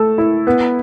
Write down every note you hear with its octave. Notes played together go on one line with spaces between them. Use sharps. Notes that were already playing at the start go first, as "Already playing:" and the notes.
Already playing: A3 A4
E4
B3